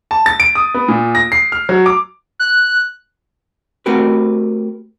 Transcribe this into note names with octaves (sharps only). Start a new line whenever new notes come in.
A5
A6
D7
D#6
B3
A#2
A#6
C7
F6
F#3
D6
F#6
A3 C4 F#4 G4 A#4 B4